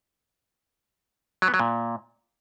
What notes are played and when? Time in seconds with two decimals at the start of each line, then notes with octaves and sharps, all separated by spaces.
1.42 F#3
1.48 B3
1.54 F#3
1.59 A#2